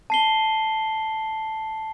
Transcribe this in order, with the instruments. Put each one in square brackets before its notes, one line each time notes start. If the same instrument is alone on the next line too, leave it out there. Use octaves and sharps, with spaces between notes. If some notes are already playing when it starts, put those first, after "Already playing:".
[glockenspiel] A5 C7 G7